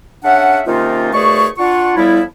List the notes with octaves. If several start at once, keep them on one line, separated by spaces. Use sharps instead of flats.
C#3 C#4 D4 E5 F#5
C3 D#3 A#3 C#4 D#4 F4
D#2 B2 A3 G#4 D5 C#6
D4 F4 F#5 C#6
A2 F3 G3 B3 E4